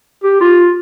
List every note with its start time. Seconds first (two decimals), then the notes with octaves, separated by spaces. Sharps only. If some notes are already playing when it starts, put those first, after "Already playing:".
0.23 G4
0.41 F4